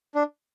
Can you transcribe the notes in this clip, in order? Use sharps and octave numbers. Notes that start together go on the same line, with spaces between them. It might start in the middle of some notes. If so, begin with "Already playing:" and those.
D4